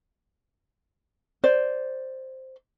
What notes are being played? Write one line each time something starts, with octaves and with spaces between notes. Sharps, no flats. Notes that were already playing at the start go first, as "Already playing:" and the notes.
C5 D5